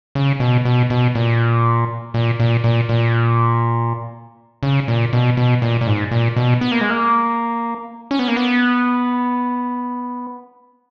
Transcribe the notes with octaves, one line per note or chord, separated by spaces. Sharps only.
C#3
B2
B2
B2
A#2
A#2
A#2
A#2
A#2
C#3
A#2
B2
B2
A#2
A#2
G#2
A#2
B2
B3
A#3
G#3
A#3
C#4
B3
A#3
B3